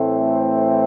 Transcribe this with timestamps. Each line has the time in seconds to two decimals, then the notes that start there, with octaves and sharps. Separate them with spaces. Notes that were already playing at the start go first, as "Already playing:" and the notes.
Already playing: A2 E3 A3 C4